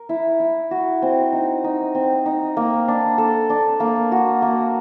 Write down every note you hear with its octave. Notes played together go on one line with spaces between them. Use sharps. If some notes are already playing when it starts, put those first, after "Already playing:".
Already playing: A#4
E4
E4
F#4
C4
D#4
D#4
C4
D#4
A#3
D4
A4
D4
A#3
F#4
A#3